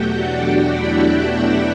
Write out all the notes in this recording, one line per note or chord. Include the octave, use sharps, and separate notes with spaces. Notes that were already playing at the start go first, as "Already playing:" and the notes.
Already playing: E2 B2 F#3 A3 F#4 G4 F#5 G5
D4 D5
F#4 F#5
E4 E5
F#4 F#5
E4 E5